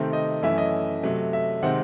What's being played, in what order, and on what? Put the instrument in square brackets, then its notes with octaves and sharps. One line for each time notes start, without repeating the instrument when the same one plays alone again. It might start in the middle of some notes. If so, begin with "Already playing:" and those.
Already playing: [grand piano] C3 D#3 A3 C4
D#5
F#2 E3 A3 C#4 E5
D#5
C3 F#3 A3
E5
C3 D#3 G#3 C4 F#5